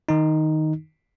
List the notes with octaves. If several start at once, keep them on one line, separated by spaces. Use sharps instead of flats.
D#3 D#4